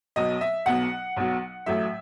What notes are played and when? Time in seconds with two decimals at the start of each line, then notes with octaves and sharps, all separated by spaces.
0.16 B1 B2 F#3 D#5
0.41 E5
0.66 B1 B2 F#3 F#5
1.17 B1 B2 F#3
1.66 A1 A2 F#3 E5